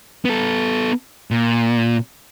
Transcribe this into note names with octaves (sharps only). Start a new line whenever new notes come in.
B3 A4
A#2